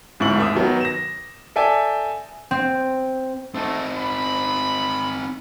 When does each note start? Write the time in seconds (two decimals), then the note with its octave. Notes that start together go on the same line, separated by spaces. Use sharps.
0.20 D1 G#2 E4 C#6 F#7
0.38 D#2 E5 D#6
0.55 D#3 F#3 B3
0.80 A#6 E7
1.56 A4 D5 E5 G5 G#5
2.51 C4
3.55 A3 C4 D#4
3.97 B5